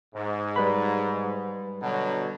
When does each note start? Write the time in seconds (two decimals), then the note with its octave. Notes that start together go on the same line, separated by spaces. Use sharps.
0.15 G#2
0.56 G3 B4 B5
1.82 B2 D3 F#3